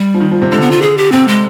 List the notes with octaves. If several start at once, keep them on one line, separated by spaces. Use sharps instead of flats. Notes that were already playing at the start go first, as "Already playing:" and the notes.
Already playing: G3
F3
D#3
F3
C3
D3 G#3
B3
F4
G#4
G4
C3 C4
G#3